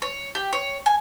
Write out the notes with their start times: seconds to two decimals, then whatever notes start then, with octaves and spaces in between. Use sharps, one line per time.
0.02 C#5
0.35 G4
0.53 C#5
0.86 G#5